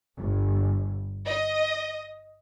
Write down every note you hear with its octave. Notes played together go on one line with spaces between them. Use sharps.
G1
D#5